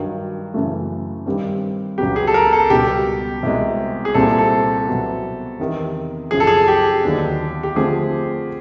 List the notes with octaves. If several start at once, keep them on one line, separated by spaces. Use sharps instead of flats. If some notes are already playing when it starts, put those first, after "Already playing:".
Already playing: G2 D#3 F#3
F#2 C#3 E3 A3
G2 D#3 G3 C4
C#2 C#3 F#3 B3 G4
G#4
A4
A#4
A4
C#2 B2 G3 G4
C2 B2 G#3
G#4
C2 A#2 G3 C4 A4
A4
C2 B2 F#3 B3
E2 C3 D#3
F#2 C#3 F3 G#4
A4
G#4
G4
D#2 D3 F#3 B3 D4
G4
D3 F3 A3 C4 G#4